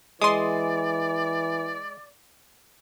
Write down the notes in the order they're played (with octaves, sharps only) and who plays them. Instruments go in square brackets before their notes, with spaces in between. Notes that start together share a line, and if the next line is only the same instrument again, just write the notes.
[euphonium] E3 [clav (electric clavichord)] G#3 [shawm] D5 [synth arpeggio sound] C6 D#6